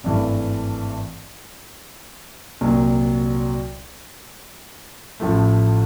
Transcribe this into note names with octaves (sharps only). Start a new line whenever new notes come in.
G#1 G2 E3 A3
C2 A#2 F#3
A1 A2 F3 A3